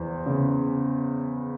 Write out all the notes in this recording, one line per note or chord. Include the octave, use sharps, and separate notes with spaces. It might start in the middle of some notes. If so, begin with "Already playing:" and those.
Already playing: E2 E3 C5
C#3